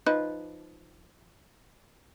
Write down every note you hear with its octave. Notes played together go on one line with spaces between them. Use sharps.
F3 D#4 B4